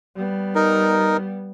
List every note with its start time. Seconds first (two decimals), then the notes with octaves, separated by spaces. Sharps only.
0.16 G3 B3
0.55 D#4 A#4